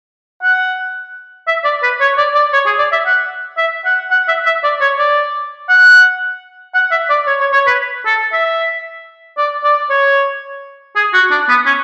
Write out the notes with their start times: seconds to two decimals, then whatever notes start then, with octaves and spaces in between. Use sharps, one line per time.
0.43 F#5
1.47 E5
1.64 D5
1.83 B4
2.00 C#5
2.18 D5
2.35 D5
2.53 C#5
2.66 G#4
2.78 D5
2.92 E5
3.06 F#5
3.57 E5
3.85 F#5
4.11 F#5
4.28 E5
4.46 E5
4.63 D5
4.81 C#5
4.99 D5
5.69 F#5
6.74 F#5
6.91 E5
7.10 D5
7.27 C#5
7.40 C#5
7.53 C#5
7.67 B4
8.06 A4
8.33 E5
9.37 D5
9.64 D5
9.90 C#5
10.96 G#4
11.14 F#4
11.31 D4
11.49 B3
11.66 C#4